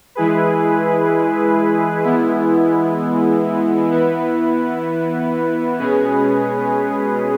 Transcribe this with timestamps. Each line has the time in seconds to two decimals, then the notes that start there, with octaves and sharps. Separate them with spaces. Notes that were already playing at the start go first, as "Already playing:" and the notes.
0.15 E3 G#3 E4 G#4 B4
2.03 E3 G#3 B3 E4
3.91 E3 B3 E4 B4
5.78 B2 G#3 C#4 G#4 B4